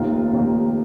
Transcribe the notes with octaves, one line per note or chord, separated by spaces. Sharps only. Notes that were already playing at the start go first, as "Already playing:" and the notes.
Already playing: F1 D#2 D#3 A#3 F4
F1 D#2 D#3 A#3 F4